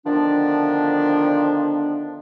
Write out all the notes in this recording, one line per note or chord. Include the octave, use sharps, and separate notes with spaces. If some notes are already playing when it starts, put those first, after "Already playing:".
D3 D#3 F3 B3 D4